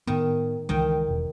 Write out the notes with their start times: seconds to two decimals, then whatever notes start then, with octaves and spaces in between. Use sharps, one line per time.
0.07 A2 D#3 B3
0.69 C#2 D#3 E3 G#3 G5
1.09 E1